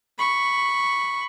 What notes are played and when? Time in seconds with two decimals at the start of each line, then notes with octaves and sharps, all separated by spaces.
0.18 B5 C#6